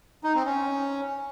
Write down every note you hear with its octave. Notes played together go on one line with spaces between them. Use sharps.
D#4
C4
C#4